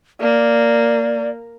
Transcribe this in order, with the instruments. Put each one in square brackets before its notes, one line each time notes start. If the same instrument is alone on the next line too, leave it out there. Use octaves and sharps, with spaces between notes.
[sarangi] A#3 [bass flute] D5